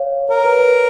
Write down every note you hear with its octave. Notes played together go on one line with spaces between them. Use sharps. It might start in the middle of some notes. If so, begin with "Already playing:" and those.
Already playing: C#5 F5
A#4 C#5
B4
B4